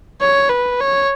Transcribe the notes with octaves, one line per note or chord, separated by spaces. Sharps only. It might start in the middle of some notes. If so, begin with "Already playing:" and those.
C#5
B4
C#5